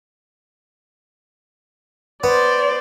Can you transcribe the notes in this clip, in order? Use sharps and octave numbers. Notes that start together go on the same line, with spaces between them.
B3 C5 D5